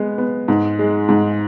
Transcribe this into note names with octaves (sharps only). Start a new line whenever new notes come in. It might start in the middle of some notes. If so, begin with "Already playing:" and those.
Already playing: G#3 B3
B3
G#2
G#3
G#2